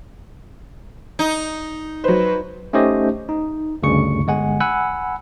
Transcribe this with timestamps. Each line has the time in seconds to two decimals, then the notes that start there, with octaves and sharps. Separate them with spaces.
1.19 D#4
2.04 F#3 B4 C5
2.73 A3 C#4 D#4 G4 C5 D#5
3.29 D#4
3.83 D2 G2 C#3 C#6 C#7
4.27 G1 G#3 F#5 G#5
4.60 F#5 G#5 B5 E6 F#6